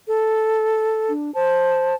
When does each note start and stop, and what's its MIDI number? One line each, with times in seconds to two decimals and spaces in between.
0.08 1.12 69
1.09 1.33 62
1.35 1.94 72
1.35 1.96 81